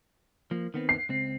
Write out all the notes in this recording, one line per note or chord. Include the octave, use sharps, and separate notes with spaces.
F3 A#3
D#3 B3 C4
C7
C#2 C4